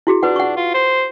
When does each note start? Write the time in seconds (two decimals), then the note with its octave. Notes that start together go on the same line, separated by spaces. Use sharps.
0.07 E4 F#4 G#4
0.23 D4 F4 B4 F#5
0.36 F#5 C#6
0.57 F4
0.74 C5